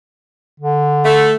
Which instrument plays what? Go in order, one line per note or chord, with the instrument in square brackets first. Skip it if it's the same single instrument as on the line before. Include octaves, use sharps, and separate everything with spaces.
[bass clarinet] D3
[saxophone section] A3